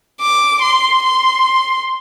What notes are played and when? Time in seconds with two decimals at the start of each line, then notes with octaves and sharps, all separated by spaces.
0.21 D6
0.62 C6
1.04 C6